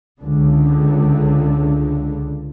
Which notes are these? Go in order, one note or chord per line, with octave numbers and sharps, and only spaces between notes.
C#2 D3